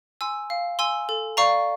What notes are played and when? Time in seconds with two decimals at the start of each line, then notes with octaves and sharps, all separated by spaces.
0.21 G#5 C6 E6
0.50 F5
0.79 G#5 C6 E6
1.09 A4
1.37 D5 F5 A#5 C#6